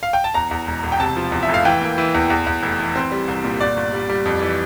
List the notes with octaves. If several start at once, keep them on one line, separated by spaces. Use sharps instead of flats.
F5
G5
A5
E2 A#5
E2
E1
E1
G5
C3 A5
F3
E2
E5
F1 F5
E3 G5
A#3
E3
E2
E2
E2
F1
E3
C4
G3
C2
A#2
G1 D5
G1
G3
G3
F2
E3